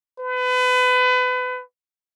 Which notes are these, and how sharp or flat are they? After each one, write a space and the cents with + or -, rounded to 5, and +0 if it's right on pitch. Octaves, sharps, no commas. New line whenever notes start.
B4 +30